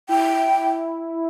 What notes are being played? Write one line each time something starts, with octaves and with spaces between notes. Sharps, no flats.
E4 G5